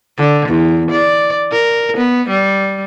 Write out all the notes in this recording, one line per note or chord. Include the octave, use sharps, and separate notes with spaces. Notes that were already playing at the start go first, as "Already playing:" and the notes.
D3
E2
D5
A#4
B3
G3